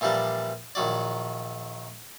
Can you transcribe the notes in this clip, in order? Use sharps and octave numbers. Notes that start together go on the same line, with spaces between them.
A#2 E3 F3 G3 D4
A#1 D#3 F#3 D5